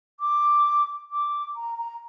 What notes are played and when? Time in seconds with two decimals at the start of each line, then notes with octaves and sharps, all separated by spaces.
0.20 D6
1.11 D6
1.56 A#5
1.77 A#5